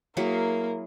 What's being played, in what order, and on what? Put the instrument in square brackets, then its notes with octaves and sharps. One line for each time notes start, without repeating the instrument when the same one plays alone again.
[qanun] F#3 E4 G#4 [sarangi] A#3 [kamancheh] A#4